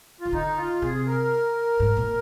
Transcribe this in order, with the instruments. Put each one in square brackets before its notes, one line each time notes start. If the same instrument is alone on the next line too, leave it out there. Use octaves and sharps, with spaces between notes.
[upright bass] D#3 [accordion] F4
[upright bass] D3 [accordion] D#4
[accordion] F4
[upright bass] C3 [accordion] G#4
[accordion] A#4
[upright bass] G#2
A#2